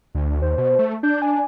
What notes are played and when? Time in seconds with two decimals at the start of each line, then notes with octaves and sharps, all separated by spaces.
0.15 D2
0.42 D#2 C5
0.58 B2
0.79 A3
1.03 D4 G6
1.22 G#5